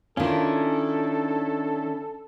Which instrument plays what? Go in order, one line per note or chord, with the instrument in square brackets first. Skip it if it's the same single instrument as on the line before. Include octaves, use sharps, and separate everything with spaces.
[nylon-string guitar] D#3 F4 [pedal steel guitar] C#4 D4 E4 [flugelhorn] A4